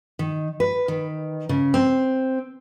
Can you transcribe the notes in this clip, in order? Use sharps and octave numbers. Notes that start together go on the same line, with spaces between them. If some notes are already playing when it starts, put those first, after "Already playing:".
D#3
B4
D#3
C#3
C4